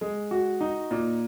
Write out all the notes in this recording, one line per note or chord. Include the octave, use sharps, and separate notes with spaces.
G#3
F#4
D#4
A#2